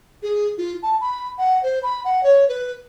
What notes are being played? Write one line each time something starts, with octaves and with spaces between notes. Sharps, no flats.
G#4
F4
A5
B5
F#5
C5
B5
F#5
C#5
B4